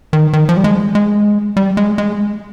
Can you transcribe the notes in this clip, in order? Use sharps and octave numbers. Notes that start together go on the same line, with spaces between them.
D#3
D#3
F3
G3
G#3
G#3
G3
G#3
G#3